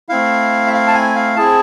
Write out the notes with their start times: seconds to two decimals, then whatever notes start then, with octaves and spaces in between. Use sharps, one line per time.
0.09 A3 C4 E4 F5
0.67 E5
0.73 F5
0.87 A5
0.94 G#5
1.15 F5
1.36 C4 E4 G#4 A5